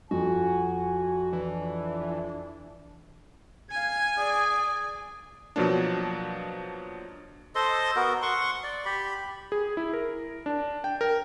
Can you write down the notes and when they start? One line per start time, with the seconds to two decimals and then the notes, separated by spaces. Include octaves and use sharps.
0.11 F2 F#4 G#5
1.33 E3 D4
3.71 F5 G#5 G#6
4.18 G#4 D5
5.56 B2 F3 F#3 A#3 D4
7.55 A4 C5 D#5 C6
7.96 B3 F#4 A#4
8.22 F#5 C6 C#6
8.64 D5
8.85 G4 B5
9.52 G#4
9.77 E4
9.93 A#4
10.46 D4
10.84 G5
11.01 A#4